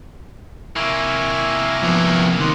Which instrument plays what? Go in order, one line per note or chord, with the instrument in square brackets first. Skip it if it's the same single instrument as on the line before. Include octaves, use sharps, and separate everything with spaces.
[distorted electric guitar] C3 A#3 [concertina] E4 G#5 C#6
[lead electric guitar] F3 B3
[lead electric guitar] D#3 [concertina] C4 F#6